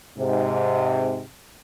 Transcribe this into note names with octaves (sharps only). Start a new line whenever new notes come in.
G#2 C3